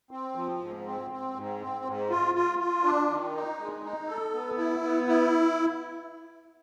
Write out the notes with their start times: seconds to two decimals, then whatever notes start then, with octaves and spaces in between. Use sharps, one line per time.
0.11 C4
0.35 F3
0.60 G#2
0.85 C4
1.11 C4
1.35 G#2
1.60 C4
1.85 G#2
2.10 F4
2.35 F4
2.59 F4
2.84 D4
3.09 D#3
3.34 D#4
3.59 G#3
3.83 D#4
4.08 A4
4.33 B3
4.57 E4
4.83 B3
5.08 E4